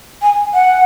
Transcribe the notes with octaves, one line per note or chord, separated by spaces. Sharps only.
G#5
F#5